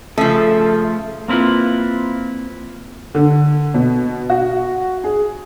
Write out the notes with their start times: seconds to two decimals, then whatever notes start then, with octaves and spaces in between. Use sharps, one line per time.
0.18 C#3 F3 A3 A4 E5
1.28 A#3 C4 E4 F4 B4
3.15 D3
3.74 B2
4.30 F#4
5.04 G#4